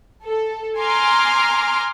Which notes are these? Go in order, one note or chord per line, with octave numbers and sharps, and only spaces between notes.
A4
G#5 A#5 C6 D6 F6